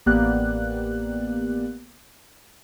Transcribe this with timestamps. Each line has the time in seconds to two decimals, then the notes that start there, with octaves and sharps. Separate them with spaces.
0.06 A1 A#3 B3 G4 D5 F#6